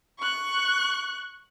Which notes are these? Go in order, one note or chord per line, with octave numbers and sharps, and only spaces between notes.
C#6 F#6